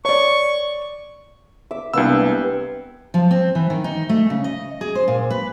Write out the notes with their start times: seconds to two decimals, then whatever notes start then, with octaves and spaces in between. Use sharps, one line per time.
0.05 C#5 D5 C#6
1.71 E5 D6
1.94 C2 G#3 A#3 B3 D4 G4 E6
3.14 F3
3.31 C4
3.55 E3
3.70 D#3
3.84 D#4
4.09 A3
4.30 C#3
4.44 D#5
4.81 G#4
4.95 C5
5.08 A#2
5.30 B4